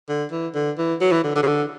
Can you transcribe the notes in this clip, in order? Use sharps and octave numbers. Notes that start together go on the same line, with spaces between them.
D3
E3
D3
E3
F#3
E3
D3
D3
C#3
D3